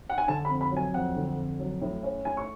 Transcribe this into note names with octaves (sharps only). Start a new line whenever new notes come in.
F#5
G#5
D3 A5
B5
F2
B5
F#3
G#5
F2 F#5
D3
F2
F#3
A2
C#4
A2 G#5
C#6